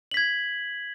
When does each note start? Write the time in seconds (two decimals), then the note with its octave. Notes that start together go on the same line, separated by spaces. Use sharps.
0.11 F#7
0.14 B6
0.17 G#6